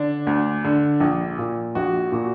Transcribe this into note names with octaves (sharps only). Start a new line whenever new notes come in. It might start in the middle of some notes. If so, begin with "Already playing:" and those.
Already playing: D3 D4
D2
D3
A#1
A#2
A#1 F#4
A#2 F#4